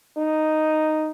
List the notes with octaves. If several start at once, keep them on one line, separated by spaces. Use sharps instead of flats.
D#4